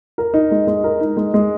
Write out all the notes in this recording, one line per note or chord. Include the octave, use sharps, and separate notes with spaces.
A#4
D#4
G#3
G#3
A#4
D#4
G#3
G#3